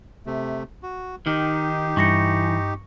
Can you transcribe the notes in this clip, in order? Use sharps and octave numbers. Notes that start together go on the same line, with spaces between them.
C3 A3
F#4
D#3 D#4 G4
G2 E3 C#6 A#6 C#7